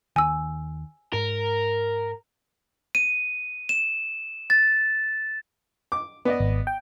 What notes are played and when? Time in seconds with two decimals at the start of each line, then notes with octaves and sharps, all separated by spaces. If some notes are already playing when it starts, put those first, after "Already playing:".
0.16 D#2 D#3 G#5 E6
1.14 G#2 A#4
2.95 D#7
3.69 E7
4.50 A6
5.92 D6
6.25 B3 D5 D#5
6.40 G#1
6.67 G5